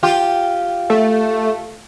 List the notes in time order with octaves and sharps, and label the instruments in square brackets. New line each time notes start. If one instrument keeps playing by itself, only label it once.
[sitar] F4 G4
[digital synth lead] A3